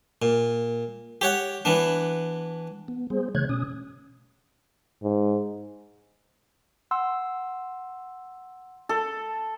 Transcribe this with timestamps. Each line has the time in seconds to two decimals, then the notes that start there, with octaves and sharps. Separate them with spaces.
0.22 A#2
1.21 G4 C#5 F#5
1.65 E3 B3 D4
2.88 B3
3.10 G3 B3 G#4 C5
3.35 C#3 E3 A3 C#5 F#6 G#6
3.49 B2 C#4 D#6
5.03 G#2
6.91 F#5 C6 E6
8.89 A4